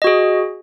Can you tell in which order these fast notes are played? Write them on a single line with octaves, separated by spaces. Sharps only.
D#5 F#4 G#4